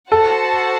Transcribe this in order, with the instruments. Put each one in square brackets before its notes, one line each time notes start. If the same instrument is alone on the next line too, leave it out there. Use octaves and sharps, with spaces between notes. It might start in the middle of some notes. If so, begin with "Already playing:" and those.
[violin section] F#4 C5 F#5 A5 [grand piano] A4